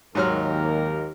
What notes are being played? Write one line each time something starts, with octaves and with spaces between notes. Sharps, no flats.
D#2 G#2 F#3 G4 A#4 F6